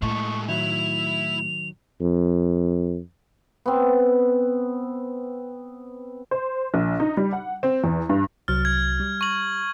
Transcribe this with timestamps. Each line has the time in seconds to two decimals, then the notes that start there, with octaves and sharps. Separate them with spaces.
0.02 A2 G#3 A3 C#6
0.48 D#3 F#3 E4 E5 F7
2.01 F2
3.66 B3 C4
6.31 C5
6.74 A#1
7.00 D#4
7.17 G3
7.33 F#5
7.63 C4
7.84 E2
8.09 G2
8.48 C2 F#3 F6 A6
8.65 G#6
9.00 G3
9.21 C#6 F#7